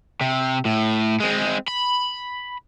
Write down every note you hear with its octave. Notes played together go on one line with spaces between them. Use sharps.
C3
A2
G#3 C4
B5